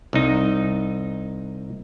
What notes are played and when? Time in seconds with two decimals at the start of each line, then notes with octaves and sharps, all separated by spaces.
0.13 C2 D#4